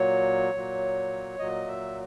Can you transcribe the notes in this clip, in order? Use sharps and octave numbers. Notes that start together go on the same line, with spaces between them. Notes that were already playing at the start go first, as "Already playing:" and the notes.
Already playing: A#2 F#3 C#5
A#2 F#3
A#2 F#3 D#5
E5